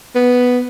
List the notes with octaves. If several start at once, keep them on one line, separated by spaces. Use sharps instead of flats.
B3